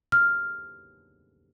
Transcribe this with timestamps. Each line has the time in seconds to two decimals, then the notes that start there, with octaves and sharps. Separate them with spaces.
0.12 F6